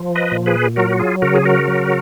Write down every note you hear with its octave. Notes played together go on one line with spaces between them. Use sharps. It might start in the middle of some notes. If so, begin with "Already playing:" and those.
Already playing: F3
B4 D#5
A#2
G#4 B4
F#3 F#4 A#4
F#4
F4 G#4
C#3 F#4 A#4
G#4
F#4 A#4
F#3